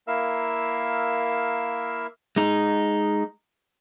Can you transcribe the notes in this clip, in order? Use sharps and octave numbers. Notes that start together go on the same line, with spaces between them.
A#3 E4 A#4 E5 F5 E6
G#3 D#4